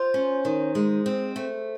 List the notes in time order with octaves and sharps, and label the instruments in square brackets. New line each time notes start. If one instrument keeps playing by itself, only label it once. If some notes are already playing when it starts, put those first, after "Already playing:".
Already playing: [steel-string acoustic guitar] F4 [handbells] C5
[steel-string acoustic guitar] C#4
D#3
G#3
C4
A3